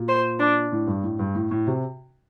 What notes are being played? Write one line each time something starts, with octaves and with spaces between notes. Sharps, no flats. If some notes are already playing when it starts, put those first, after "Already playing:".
Already playing: A#2
C5
D4
A2
G2
A2
G2
A2
A2
C3